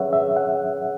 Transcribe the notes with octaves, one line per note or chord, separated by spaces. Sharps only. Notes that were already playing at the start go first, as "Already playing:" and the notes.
Already playing: G#2 F#3 C#4 G#4 B4 C#5 E5 F#5
E5
F#5